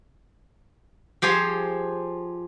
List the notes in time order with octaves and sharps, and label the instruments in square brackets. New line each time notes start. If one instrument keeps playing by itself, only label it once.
[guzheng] F3 G4 G#4 C5 C#5